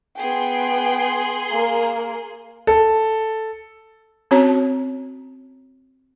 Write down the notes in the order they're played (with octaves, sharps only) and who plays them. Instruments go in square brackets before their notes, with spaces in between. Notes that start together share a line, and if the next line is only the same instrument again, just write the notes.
[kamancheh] B3 G5 [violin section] G#4 C6
[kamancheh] A#3 A#4
[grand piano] A4
[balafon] C4 C#4 F#4 C#5 A5